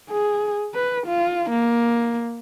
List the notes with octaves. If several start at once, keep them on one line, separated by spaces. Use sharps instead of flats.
G#4
B4
F4
A#3